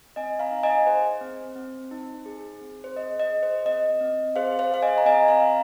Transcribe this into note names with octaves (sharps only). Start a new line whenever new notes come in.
C4 D#5 G#5
F5 A#5
D#4
D#5 G#5
G#4 C5
C4
C4
D#4
G#4
C4
C5
G#4 D#5
D#5
G#4
C5
C4 D#5
C4
G#4 C5 F5
C5 F5
G#4 F5
D#5 G#5
A#5
C4 D#5 G#5
F5 A#5
C4 F5